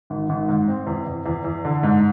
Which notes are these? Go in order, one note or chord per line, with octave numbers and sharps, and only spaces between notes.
G#1
G#1
G#2
C4
E2
E2
E2
E2
D3
G#2